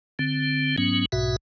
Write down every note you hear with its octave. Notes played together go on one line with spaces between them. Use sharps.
D3 C4
G#2 F#3 B3 C#4
B1 G#2 B2 F#4 E5